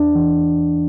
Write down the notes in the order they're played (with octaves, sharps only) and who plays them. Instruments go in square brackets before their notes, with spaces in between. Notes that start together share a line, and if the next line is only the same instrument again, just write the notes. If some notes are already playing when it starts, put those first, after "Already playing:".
Already playing: [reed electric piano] E2 D4
E3